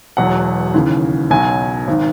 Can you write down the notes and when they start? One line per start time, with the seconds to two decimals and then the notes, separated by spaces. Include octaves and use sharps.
0.17 E1 E2 B2 F#3 F#5
0.74 D#2 C#3 E3
1.30 B1 B2 F#3 G#5
1.87 G#1 D#3